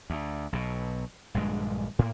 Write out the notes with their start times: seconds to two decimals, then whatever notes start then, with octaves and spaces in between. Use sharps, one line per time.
0.10 D2
0.53 B1 B2
1.34 A#1 G2 D3 G#3
1.99 A2 A#3